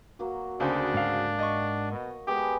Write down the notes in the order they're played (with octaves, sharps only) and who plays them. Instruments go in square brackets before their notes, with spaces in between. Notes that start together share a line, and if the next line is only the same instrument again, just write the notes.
[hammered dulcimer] F#3 A#3 F#4
[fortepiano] D2 C#3 C4 [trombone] D4
[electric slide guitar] G#2 F5
[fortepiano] D#5 C#6
[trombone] B2
[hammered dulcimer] G#3 B3 A4 [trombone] G4